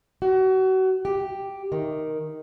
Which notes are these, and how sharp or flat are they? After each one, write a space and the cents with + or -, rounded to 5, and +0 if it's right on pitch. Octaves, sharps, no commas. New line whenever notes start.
F#4 +30
G4 +0
D#3 +0